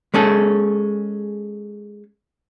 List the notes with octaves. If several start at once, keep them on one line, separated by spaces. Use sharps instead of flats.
G#3 C#4 G#4 A4